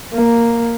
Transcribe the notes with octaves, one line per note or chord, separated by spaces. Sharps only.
A#3